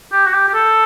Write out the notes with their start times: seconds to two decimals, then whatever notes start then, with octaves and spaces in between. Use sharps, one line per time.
0.12 G4
0.27 F#4
0.33 G4
0.48 G4
0.54 A4